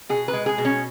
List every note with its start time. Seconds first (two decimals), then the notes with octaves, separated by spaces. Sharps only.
0.09 B2 G#4
0.28 B4
0.33 G#3
0.46 G#4
0.58 B2
0.65 C#4